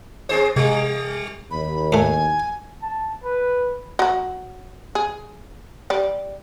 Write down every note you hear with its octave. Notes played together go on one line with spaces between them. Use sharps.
C4 G#4 C5
C3 G3
D#2 B5
A2 A3 G#5
A5
B4
F#3 F#4
G#4
G3 D5